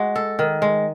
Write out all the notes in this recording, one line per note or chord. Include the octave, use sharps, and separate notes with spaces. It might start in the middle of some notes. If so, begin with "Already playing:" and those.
Already playing: G#3 F#4
A4
D#3
G#3